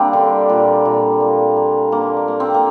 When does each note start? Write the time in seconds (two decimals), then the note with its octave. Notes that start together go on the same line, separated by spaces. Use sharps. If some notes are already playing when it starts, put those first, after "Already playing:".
Already playing: G3 A#3 C4 D4
0.13 D3
0.49 A#2
0.85 A#2
1.20 A#3
1.57 A#3
1.92 D3 A#3
2.17 A#3
2.28 A#3
2.40 C4
2.54 A#3